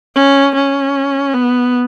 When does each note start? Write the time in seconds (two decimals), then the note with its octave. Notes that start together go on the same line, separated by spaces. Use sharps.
0.15 C#4
0.55 C#4
1.34 B3